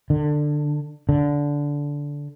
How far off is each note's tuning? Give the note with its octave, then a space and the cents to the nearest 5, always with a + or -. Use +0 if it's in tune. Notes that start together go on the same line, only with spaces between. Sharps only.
D3 +15
D3 -15